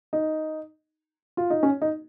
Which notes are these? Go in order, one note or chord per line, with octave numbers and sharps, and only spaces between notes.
D#4
F4
D#4
C#4
D#4